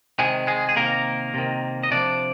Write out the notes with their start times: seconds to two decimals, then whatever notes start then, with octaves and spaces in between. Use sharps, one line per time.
0.19 C3 D#3 G#3 G#4
0.47 G#3 G#4
0.69 G#4
0.76 C3 D#3 A#3 A#4
1.34 C3 D#3
1.83 D#5
1.91 C3 F3 D4 D5